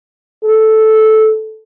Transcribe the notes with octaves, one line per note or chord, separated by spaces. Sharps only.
A4